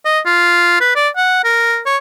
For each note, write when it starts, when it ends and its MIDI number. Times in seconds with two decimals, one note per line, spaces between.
0.05 0.20 75
0.26 0.78 65
0.81 0.91 71
0.95 1.09 74
1.16 1.42 78
1.44 1.80 70
1.86 1.97 73